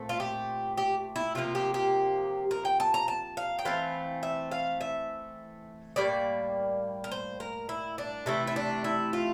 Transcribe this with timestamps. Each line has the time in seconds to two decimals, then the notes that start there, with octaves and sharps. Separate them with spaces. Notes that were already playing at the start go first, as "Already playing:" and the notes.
Already playing: A#2 A3 C4
0.09 F4
0.20 G4
0.78 G4
1.16 E4
1.35 C3 F3 A#3 F4
1.55 G4
1.74 G4
2.51 A#4
2.65 G5
2.80 A5
2.94 A#5
3.08 A5
3.37 F5
3.59 G5
3.65 E3 A3 C4 F5
4.23 E5
4.51 F5
4.81 E5
5.96 A2 G3 A#3 D5
7.04 A#4
7.12 C5
7.40 A#4
7.69 E4
7.98 D4
8.26 C3 E3 A3 E4
8.47 E4
8.56 D4
8.84 E4
9.13 F4